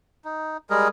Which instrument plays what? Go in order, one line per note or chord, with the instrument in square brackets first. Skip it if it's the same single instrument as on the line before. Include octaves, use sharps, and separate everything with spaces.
[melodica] D#4
G3 G#3 G#4 A#4